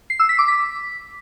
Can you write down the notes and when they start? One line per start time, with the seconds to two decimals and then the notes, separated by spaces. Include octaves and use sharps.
0.10 C7
0.19 E6
0.29 B6
0.39 D6
0.48 B6